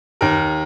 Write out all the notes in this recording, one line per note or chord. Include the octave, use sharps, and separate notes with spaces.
D#2 A#4